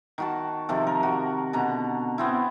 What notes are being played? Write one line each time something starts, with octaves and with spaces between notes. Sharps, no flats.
D#3 F#4 A5
C3 D#3 F3 A4
A#4
F#4
B2 D3 A#5
B3 C4 E4